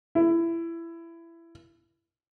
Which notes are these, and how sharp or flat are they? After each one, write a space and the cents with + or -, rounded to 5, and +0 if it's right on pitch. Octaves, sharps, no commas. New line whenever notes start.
E4 +20